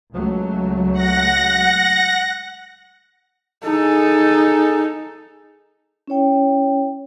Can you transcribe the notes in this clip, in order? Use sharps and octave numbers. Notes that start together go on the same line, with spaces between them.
C#2 F#3 A3
F#5 A#6
D#4 G#4 A4
C#4 E4 C#5 G5